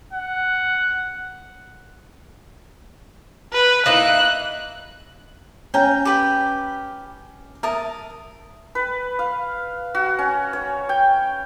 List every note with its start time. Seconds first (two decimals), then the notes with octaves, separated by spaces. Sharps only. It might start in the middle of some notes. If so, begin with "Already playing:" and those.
0.13 F#5
3.53 B4
3.86 A#3 D#4 E4 F#6
5.74 C#4 G5 G#5 A#5
6.05 G4 B4 G5
7.63 A#4 E5 A5 D#6
8.75 B4
9.19 F5
9.95 F#4
10.19 C#4
10.53 C#5
10.89 G5